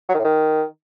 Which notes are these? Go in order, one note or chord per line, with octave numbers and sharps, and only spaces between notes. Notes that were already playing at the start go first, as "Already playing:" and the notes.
F#3
D#3
A2
D#3